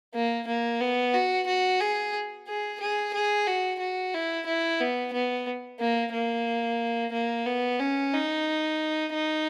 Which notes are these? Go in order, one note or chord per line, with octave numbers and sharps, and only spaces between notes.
A#3
A#3
B3
F#4
F#4
G#4
G#4
G#4
G#4
F#4
F#4
E4
E4
B3
B3
A#3
A#3
A#3
B3
C#4
D#4
D#4